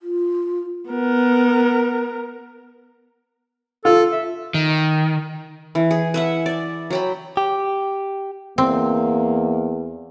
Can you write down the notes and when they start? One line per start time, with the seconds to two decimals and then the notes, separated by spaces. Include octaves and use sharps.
0.01 F4
0.89 B3 A#4
3.85 F4 A4
4.12 E5
4.54 D#3
5.75 E3
5.91 G#4
6.14 B4 E5 F#5
6.46 D5
6.90 F#3 G5 B5
7.37 G4
8.58 E2 A#3 C4